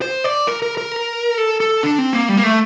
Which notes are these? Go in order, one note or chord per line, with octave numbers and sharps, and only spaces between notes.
C5
D5
A#4
A#4
A#4
A4
A4
D4
C4
A#3
G3
A#3
A3